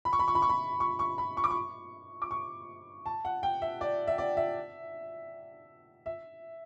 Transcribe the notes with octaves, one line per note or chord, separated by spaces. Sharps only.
B5
C#6
B5
C#6
B5
C#6
B5
C#6
C#6
B5
C#6
D6
C#6
D6
C#6
A5
F#5
G5
E5
D5
E5
D5
E5
E5